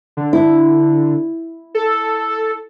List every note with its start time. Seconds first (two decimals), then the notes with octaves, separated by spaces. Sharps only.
0.17 D3
0.33 E4
1.75 A4